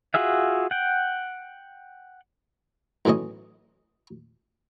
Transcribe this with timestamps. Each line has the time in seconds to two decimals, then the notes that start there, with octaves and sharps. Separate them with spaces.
0.14 F4 F#4 G#4 E5 F5
0.71 F#5 G5
3.05 B1 A2 E3 C#4 D#5